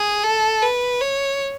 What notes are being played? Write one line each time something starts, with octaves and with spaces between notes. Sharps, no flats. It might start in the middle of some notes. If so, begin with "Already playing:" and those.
Already playing: G#4
A4
B4
C#5